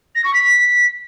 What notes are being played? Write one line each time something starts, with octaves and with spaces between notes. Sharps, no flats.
A#6
C#6
B6